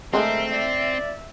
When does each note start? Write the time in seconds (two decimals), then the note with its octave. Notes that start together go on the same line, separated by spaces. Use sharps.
0.13 G#3 A3 C4 D4 G#4 A#4 E5
0.53 D5 E5